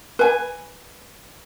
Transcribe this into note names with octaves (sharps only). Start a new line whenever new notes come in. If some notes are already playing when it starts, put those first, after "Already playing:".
B4 G#5